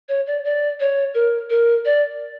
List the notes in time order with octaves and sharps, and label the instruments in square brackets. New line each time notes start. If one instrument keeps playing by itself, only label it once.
[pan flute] C#5
D5
D5
C#5
A#4
A#4
D5